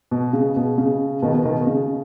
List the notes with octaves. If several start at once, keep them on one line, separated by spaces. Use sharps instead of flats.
B2
C#3
B2
C#3
B2 D#3
B2
B2 D#3
C#3